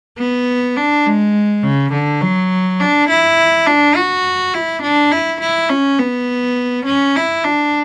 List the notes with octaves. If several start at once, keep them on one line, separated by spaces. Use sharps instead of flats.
B3
D4
G#3
C#3
D3
F#3
D4
E4
D4
F#4
E4
D4
E4
E4
C#4
B3
C#4
E4
D4